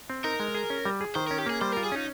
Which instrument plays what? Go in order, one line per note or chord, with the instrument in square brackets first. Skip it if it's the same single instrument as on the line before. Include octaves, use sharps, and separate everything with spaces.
[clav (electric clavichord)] C4
[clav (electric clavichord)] D#4 [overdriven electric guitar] A#4
[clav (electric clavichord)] G#3
G#4
C#4
G3
G#4
[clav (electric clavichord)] D#3 [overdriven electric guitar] C5
[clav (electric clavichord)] C#4 [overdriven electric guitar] A#4
[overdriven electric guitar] G4
[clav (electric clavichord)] A#3 [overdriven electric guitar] G#4
[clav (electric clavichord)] G3 [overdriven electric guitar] C5
[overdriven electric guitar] A#4
[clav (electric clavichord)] F4
[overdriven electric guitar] G#4
[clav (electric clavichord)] C#4 [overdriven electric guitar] D#4